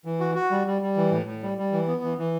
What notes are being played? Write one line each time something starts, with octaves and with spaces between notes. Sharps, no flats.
E3
F#4
F#4
G3
G3
G3
E3
A2
A2
G3
G3
E3
B3
E3
E3